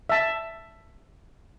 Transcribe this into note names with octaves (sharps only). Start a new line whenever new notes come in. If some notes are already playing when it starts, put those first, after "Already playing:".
E5 A5